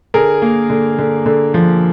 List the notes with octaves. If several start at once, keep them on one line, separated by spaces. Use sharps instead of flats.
D3 G#4 A#4
A#3
D3
D3
D3
F3